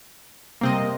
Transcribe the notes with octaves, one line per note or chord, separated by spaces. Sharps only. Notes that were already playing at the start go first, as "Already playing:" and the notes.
C3 G3 A#3 C4 D#5